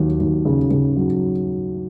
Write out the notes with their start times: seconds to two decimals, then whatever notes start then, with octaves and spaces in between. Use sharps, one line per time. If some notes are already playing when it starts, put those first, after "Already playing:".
Already playing: D#2 F#3
0.20 D#2
0.45 C#3
0.71 C#3
0.97 F#3